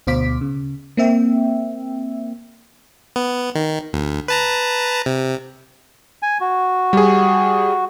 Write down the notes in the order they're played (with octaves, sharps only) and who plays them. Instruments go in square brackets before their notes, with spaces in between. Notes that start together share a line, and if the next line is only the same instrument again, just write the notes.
[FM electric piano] D2 B2 C5 F5 D6 B6
C#3
A#3 C4 E5 G5
[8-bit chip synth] B3
D#3
D2
B4 A5 A#5
C3
[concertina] G#5
F#4
[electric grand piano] G3 G#4